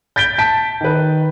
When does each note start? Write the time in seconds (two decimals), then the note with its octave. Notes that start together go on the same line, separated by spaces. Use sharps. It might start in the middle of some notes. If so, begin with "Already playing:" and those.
0.16 G6 A6 B6 D7 G7
0.38 A5 B6 D7
0.81 D#3 B4